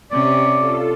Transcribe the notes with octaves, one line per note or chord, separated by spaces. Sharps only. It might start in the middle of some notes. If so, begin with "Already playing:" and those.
C3 C#4 G4 D5
F4 A4